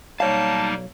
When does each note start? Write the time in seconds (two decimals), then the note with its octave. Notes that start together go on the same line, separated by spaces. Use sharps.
0.20 B1 G3 A#3 D#4 C#5 F5 A5